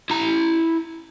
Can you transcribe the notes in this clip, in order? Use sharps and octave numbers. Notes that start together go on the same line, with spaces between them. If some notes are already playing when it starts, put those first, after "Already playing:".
E4 A#5